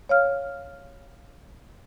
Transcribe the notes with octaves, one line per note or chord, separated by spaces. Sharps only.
C#5 F5 F6